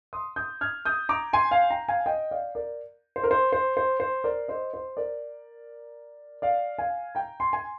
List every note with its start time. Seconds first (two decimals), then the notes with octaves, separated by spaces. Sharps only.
0.13 C6 D#6
0.36 D#6 G6
0.61 F6 G#6
0.85 D#6 G6
1.09 A#5 D6
1.33 G#5 C6
1.51 F5 G#5
1.70 G5 A#5
1.88 F5 G#5
2.06 D#5 G5
2.31 D5 F5
2.55 A#4 D5
3.16 C5
3.23 A#4
3.31 C5
3.53 C5
3.77 C5
4.00 C5
4.24 A#4 D5
4.48 C5 D#5
4.74 C5
4.97 A#4 D5
6.42 D5 F5
6.78 F5 G#5
7.15 G5 A#5
7.40 G#5 C6
7.53 G#5